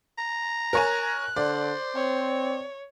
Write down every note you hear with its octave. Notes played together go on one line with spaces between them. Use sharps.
A#5
A#4 C#5 G#5 F#6
D3 C5 D5
C4 C#5